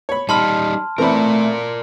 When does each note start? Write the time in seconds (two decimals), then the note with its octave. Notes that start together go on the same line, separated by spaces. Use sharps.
0.09 C#5 B5
0.29 G3 D#4 A5 B5 C6 F6
0.98 E3 A3 C4 A#4 D5 B5